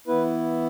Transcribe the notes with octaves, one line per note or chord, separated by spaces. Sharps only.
E3 B3 E4 B4